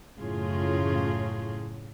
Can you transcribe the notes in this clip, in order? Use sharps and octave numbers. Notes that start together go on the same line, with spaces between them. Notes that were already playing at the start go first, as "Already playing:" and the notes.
F#2 A2 C#3 F4 G#4